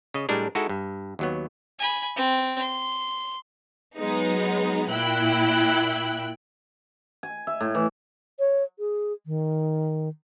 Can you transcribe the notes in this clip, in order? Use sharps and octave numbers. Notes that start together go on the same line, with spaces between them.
C#3 D#5
A2 G3 G#3 D4 A#4
G#3 D#4 E4 F#4 A4
G2
D#2 F#3 B3
G#5 B5
C4
C6
F#3 G#3 B3 D#4
A#2 E4 G5 F#6
G#5
E5
A2
E3
C#5
G#4
D#3